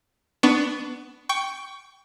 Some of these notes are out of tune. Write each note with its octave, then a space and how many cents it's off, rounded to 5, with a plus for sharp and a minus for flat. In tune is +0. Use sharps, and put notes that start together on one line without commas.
B3 +10 D4 +10 C#6 +15
G5 +0 C#6 +20